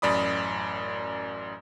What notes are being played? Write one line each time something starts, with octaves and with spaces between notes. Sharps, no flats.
A1 F#2 D5 B5 D#6